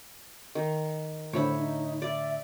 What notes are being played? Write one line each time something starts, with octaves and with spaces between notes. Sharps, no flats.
D#3
A2 D3 C5 C#5 E5 B5
D#4
D5 E5